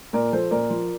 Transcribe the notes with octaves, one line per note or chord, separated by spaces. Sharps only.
A#2 A#4 D5
F3 A4 C5
A#2 A#4 D5
F3